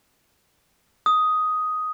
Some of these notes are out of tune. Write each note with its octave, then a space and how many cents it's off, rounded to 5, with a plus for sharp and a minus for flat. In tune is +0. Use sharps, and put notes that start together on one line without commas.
D#6 +5